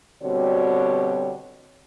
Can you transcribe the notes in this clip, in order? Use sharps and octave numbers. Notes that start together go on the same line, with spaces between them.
B2 D3 G3 C4 F#4 C#5